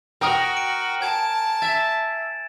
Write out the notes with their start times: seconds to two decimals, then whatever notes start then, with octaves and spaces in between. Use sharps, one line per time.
0.21 F#4 A#4 G5 D#6
0.57 D7
1.02 G#5 A5 G#6
1.62 E5 A6 E7